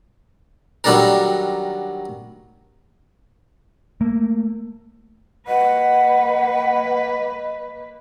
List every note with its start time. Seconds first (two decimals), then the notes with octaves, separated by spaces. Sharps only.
0.84 D#3 F#3 G3 D4 A4 A#4
4.01 A3 A#3
5.48 A#3 B4 D#5 F#5